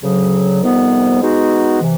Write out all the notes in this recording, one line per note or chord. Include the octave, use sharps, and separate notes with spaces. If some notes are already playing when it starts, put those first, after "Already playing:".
D2 C#3 F#3
F2 C3 D#3 G3 B3
G#3 B3 D#4 F#4
C3 E3